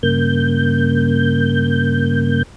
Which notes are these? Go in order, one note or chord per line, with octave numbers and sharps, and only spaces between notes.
G2 C#3 A#3 G6